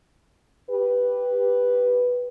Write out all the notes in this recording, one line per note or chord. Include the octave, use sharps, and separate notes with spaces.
G4 B4